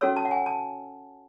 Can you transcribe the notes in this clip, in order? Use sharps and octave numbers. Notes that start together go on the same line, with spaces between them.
C#4 F#4 A4 C#5 E6
A5
F#5
G#5
A5